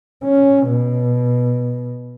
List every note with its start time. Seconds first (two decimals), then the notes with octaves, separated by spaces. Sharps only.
0.24 C#4
0.67 B2